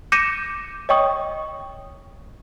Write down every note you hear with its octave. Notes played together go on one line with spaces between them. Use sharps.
D6 G6 A#6 C#7 D#7 E7
C#5 D#5 G5 C#6 D#6